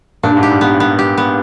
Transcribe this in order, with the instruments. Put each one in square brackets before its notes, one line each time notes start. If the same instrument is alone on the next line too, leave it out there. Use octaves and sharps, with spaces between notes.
[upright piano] A#2 [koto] D4
[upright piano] G2
G#2
[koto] G4
[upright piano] G#2
[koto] B3
[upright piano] G2
[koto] B3
G4
B3